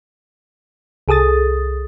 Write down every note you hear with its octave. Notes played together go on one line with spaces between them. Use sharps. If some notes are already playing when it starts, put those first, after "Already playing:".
C2 G#4 A4 D#6 A6